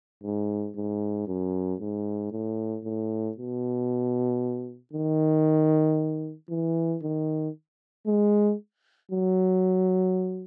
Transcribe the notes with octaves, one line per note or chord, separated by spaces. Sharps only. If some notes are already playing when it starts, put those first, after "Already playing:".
G#2
G#2
F#2
G#2
A2
A2
B2
D#3
E3
D#3
G#3
F#3